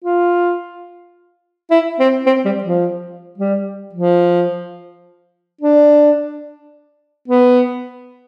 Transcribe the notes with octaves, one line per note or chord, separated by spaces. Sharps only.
F4
E4
C4
C4
G3
F3
G3
F3
D4
B3